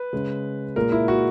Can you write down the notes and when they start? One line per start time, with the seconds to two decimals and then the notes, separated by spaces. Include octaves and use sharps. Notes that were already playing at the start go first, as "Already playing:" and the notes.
Already playing: B4
0.13 C#3 G#3
0.76 A#2 G#3 A#4
0.92 E4
1.08 F#4